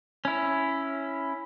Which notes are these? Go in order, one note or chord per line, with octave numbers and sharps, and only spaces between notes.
C#4 E4